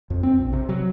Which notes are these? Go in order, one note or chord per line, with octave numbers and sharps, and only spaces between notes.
F2
C4
A#1
C3
F#3